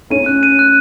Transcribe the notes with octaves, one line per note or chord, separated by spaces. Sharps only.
C#4 D#7
F#6
D#7
F#6